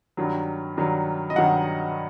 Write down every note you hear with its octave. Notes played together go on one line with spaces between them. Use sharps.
G2 D#3 F#3
G2 D#3 F#3
D#5
G2 D#3 F#3 F#5